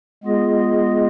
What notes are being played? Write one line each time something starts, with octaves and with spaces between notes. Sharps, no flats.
G#3 B3 F4 G#4 D#5